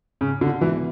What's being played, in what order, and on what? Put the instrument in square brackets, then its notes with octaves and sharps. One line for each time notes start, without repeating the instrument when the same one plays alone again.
[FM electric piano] G#2 [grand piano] C#3
[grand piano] D3
[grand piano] E3 [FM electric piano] G#3 B3 D4 F#4